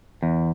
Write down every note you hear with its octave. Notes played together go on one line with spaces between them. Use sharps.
E2